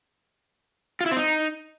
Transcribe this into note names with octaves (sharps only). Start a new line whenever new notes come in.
F4
E4
C4
D#4